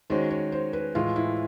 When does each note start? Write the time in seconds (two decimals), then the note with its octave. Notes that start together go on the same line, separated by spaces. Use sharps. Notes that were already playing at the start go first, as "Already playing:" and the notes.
0.10 D#3 G#3 C#4 F#4 C5
0.31 C#5
0.52 C5
0.73 B4
0.95 A2 E3 G#3 F4
1.16 E4